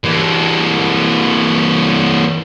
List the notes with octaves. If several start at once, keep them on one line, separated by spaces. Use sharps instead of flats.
E3 A#3